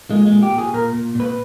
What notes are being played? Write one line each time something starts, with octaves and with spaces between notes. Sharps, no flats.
A#2 G#3
G#3
A#2
G4
A#2
G#4
A#2 A#4
A#2
A#2 B4